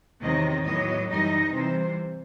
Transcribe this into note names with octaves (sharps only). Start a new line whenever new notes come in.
E2 C3 D#3 F#3 C4 D#5
A2 F#3 B3 D#5
F#2 E3 G3 D#4 D#5
C3 E3 G3 C5